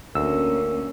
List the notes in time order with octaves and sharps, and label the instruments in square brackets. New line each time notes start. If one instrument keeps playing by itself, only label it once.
[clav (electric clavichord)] D2 [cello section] A#3 C#4 [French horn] A#4 [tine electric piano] E6